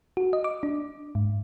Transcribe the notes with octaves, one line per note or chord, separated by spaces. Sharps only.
F#4
D#5
D6
D4
G#2